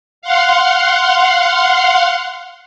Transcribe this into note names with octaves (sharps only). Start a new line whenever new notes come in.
F5 F#5 C6